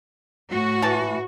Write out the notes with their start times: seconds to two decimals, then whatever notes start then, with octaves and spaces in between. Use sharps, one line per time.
0.51 A2 F#4
0.82 E3 A5